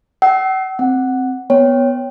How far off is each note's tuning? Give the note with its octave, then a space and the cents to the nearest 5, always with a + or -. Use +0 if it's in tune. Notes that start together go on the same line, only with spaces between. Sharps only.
F#5 +45 E6 -20
C4 +0 F#5 +0
B3 +0 C#5 +0 G5 +0